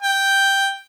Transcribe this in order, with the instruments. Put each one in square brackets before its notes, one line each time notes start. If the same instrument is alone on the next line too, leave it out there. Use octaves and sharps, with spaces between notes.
[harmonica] G5